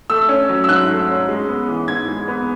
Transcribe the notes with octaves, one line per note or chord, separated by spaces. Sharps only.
A3 E6
C#4
F#3
E6
G#2 F#6
A3
C#4
G#3
B3
E3
G#2 G#6
G#3
B3